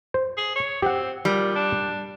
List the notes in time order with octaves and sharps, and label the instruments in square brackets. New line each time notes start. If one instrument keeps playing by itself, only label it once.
[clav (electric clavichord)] C5
[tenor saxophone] G#4
C#5
[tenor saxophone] C4 [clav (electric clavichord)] G4 F#5
[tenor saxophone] A#2 [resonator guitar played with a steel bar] G3
[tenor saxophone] D4